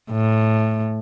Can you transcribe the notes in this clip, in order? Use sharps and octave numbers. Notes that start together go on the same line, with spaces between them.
A2